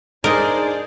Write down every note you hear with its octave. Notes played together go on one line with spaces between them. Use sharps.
D4 D#4 G#4 A#4 C5 D5